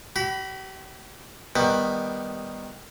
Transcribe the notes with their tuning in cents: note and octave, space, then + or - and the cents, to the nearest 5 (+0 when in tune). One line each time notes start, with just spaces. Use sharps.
G4 -45 B5 +0
D#3 +0 G3 +10 B3 +0